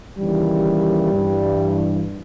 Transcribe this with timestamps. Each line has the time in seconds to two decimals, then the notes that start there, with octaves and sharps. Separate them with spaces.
0.19 D#2 C#3 E3 G3
1.11 G2 E3